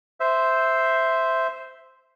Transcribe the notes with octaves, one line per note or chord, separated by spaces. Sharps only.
C5 E5